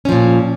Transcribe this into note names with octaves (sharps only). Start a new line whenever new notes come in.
A#2 F3 C#4